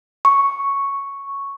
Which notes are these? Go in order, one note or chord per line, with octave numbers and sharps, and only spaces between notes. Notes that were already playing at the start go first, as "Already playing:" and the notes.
C#6